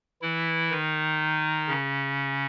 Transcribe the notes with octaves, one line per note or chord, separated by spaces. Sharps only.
E3 E4
D#3 D#4
C#3 C#4